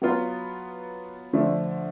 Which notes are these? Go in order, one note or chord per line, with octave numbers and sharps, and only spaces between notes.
F#3 B3 F4
D3 F3 A3 D4